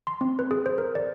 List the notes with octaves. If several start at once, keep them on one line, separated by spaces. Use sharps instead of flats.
C6
C4
B4
G#4
C5
A#4
D5